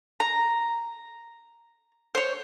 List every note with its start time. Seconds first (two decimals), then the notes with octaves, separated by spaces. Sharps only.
0.20 A#5
2.15 C5 C#5